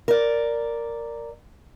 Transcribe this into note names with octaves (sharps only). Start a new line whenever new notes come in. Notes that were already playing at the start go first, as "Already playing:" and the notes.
A#4 D5